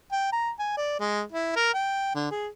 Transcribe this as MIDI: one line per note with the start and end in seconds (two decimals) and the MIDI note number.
0.12 0.32 79
0.32 0.50 82
0.59 0.76 80
0.77 0.98 74
1.00 1.22 56
1.32 1.56 64
1.56 1.69 70
1.74 2.15 79
2.15 2.29 50
2.31 2.48 68